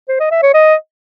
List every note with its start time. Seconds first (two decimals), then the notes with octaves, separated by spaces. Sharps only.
0.09 C5
0.20 D#5
0.31 E5
0.43 C#5
0.54 D#5